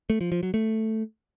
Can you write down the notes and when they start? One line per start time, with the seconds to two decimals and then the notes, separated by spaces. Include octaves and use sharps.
0.10 A3
0.21 F3
0.32 F3
0.43 F#3
0.54 A3